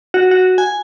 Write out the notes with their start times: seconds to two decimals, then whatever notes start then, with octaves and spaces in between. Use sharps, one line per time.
0.14 F#4
0.31 F#4
0.58 G#5